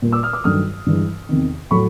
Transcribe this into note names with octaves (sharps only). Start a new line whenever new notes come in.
A#2 G3
D6 E6
D#6 F6
D6 E6
G2 D#3 F#3 A3 D#6 F6
G2 E3 G#3
E2 C3 D#3
A2 F#3 A3 B5 C#6